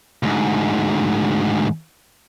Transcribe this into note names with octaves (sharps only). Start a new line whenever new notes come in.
D2 G#2